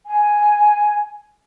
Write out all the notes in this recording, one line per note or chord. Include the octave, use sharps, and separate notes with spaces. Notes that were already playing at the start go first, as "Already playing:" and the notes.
G#5